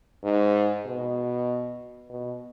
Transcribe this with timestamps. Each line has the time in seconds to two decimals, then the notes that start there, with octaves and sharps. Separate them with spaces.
0.23 G#2
0.86 B2
2.09 B2